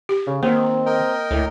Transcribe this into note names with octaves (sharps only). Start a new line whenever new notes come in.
G4
C#3
D#3 A#3 C4
A#4 D#5 G5
D2 A2